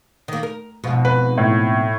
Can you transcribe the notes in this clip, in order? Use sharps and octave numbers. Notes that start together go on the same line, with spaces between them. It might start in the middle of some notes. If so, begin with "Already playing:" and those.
D#3 A#3
A#4
F2 G#2 B2
B4
A2